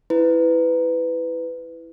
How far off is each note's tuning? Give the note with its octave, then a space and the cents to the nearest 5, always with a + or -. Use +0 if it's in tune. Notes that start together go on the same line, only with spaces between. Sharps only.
E4 +0 B4 +20